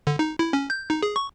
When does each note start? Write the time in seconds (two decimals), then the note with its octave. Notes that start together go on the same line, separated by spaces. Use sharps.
0.07 D3
0.19 D#4
0.39 E4
0.53 C#4
0.70 G6
0.90 D#4
1.03 G#4
1.16 C#6